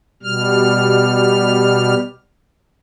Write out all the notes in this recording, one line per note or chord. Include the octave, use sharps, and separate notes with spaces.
B2 G3 F6